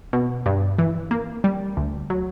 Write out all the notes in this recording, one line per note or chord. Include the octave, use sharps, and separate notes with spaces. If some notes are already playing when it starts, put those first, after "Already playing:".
B2
G2
E3
A#3
G3
D2
F#3